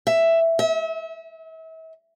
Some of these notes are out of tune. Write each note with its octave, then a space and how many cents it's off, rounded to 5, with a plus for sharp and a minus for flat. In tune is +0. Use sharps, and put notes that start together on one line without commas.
E5 +5
E5 -35